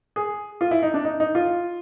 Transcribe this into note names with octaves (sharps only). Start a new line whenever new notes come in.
G#4
F4
E4
D#4
D4
D#4
D#4
F4